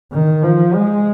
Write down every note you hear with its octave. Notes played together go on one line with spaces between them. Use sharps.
D#3
F3
G#3